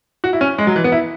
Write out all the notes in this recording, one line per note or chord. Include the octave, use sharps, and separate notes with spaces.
F#4
E4
C#4
G#3
F#3
E3
B3
E4